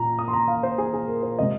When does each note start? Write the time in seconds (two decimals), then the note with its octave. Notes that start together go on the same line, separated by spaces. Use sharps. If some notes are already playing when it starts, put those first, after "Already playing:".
Already playing: A#2 A#5
0.19 D#6
0.28 C6
0.33 A#5
0.48 F5
0.63 C5
0.78 G#4
0.93 G#4
1.08 A#4
1.23 C5
1.39 C3 G#3 D#5